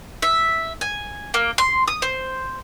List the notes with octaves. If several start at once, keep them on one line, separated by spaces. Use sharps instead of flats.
E5
G#5
A#3
C6
D#6
C5